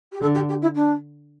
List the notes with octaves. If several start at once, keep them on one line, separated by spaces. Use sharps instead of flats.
G4
D3 A4
G4
G4
E4
D4